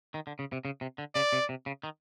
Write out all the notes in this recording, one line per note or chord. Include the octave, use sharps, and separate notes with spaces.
D#3
D3
C#3
C3
C#3
C3
D3
C#3 D5
C3
C3
C#3
D#3